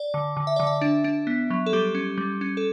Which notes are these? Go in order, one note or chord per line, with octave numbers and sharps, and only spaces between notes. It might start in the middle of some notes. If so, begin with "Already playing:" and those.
Already playing: D5
D3
D3
E5
D3 D5
E5
D4
D4
B3
F#3
A4
G3 G4
C#4
G3
C#4
A4